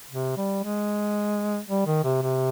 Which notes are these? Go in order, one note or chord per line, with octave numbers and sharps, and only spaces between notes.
C3
G3
G#3
G3
D#3
C3
C3